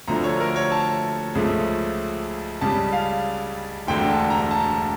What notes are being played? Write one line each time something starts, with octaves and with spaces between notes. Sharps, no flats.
D2 D3 F3 A3 A#5
C#5
A#4
C#5
A5
C#2 C#3 F3 A3
C#2 C#3 G3 A5
F5
E1 D2 D3 G5
A5
A#5
A5